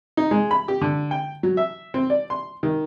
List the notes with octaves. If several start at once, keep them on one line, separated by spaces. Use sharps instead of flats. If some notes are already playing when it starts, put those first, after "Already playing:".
D#4
G#3
B5
G4
D3
G5
F#3
E5
C4
D5
C6
D#3